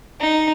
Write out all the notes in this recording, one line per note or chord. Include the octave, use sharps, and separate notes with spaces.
D#4